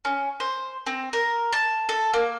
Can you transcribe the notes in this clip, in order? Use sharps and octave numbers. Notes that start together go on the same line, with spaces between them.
C#4
C5
C4
A#4
A5
A4
A#3